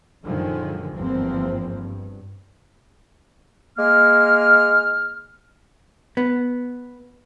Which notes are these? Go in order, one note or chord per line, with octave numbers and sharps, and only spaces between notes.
F#2 A#2 D3 D#3 F3 G#3
G1 E2 G#2 F3 A#3 C4
G2
G#3 A#3 F6
B3